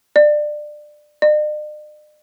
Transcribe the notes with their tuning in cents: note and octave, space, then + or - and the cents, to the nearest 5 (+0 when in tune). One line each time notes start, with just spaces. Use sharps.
D5 +25
D5 +45